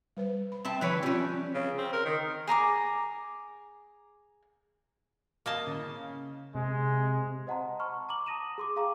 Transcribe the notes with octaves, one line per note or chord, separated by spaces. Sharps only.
G3 B4 C5
B5
C4 E5 G5 A5 C6
D3 E3 F3 B4 C#5
G3 C4 C#4 F4 C#5
C#3
C4
A#4
D#3
G#4 A#5 C6 D6
A#3 D#5 A5
C#3
C3 G#3
C5 D#5 F#5 A5 A#5 C6
A5 B5 C#6 F6
A#5 D6 F#7
A5 D#6 A#6 D#7 E7
G#4 C6 D6
G#4 F5 G5 A#5 D6